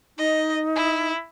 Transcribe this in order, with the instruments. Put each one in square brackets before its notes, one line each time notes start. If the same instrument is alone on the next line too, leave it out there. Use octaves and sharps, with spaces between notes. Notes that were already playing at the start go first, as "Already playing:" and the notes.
[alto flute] D#4 [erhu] D#5
[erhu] E4